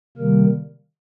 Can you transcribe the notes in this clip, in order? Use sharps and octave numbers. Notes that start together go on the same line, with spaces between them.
C3 D#3 G3 A#3 A#4